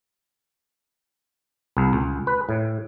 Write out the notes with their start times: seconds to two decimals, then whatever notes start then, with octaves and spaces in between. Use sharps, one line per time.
1.77 C2
1.93 C#2
2.27 B4
2.49 A2